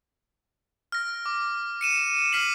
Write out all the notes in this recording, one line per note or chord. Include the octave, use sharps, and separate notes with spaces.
F6 A#6
D6
C#7 D#7 E7
F6 B6 C7 D#7 F#7